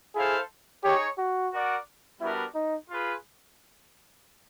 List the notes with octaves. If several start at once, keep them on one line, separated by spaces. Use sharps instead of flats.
E4 G#4 A4 C5 F5
D#4 G4 G#4 C#5
F#4
F#4 A#4 D5 F#5
G3 B3 D4 E4 F#4 A#4
D#4
F4 G#4 B4